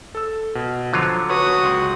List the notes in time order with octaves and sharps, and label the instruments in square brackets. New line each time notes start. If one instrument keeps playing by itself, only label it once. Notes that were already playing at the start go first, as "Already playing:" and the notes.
[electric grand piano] A4 E6
B2
[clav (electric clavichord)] D3 F#3 F4 [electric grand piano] F3
[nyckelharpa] F#4 D#6 [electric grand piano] B4 C#5
[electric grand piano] C#2 C6